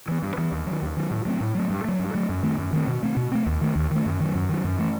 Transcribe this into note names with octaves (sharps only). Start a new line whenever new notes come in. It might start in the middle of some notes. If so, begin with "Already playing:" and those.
E3 B3
G2
E3 B3
D#2
D#3 F#3
D#2
D#3 F#3
A2
F#3 A3 C4
A2
F#3 A3 C4
G2
F#3 A3
G2
F#3 A3
F#2
D#3 A3 C4
F#2
D#3 A3 C4
B2
A3 C4
B2
A3 C4
D#2
D#3 A3
D#2
D#3 A3
F#2
D#3 F#3
F#2
D#3 F#3
F#2
E3 A3